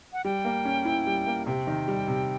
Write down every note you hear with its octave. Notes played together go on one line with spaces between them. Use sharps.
F#5
G3 G5
A#3
C#4
E4
G3
A#3
C3 G5
D#3
G3
C3